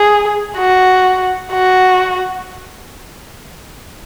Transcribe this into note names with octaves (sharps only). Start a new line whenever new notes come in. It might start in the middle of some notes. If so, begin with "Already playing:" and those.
Already playing: G#4
F#4
F#4